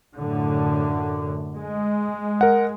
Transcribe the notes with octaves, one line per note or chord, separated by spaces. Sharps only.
F#2 A2 D3
G#3
A#4 F#5